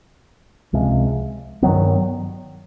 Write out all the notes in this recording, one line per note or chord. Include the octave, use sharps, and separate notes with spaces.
C#2 C3 F3 G#3
G2 D#3 F#3 B3